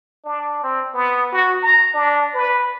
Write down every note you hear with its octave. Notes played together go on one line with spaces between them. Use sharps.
D4
C4
B3
F#4
A#5
D4
B4